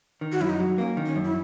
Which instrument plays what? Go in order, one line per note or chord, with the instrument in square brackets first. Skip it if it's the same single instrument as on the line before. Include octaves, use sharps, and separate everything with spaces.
[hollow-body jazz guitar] D#3
[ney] F#4
[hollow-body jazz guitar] F#2 [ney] E4
[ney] D#4
[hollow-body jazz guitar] F#3
[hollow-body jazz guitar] A#3 [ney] C#4
[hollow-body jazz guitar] D#3
[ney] C#4
[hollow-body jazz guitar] F#2
[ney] E4